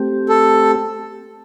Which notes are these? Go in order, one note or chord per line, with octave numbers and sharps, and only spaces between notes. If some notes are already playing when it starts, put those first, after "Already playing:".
Already playing: A3 C4 G4
A4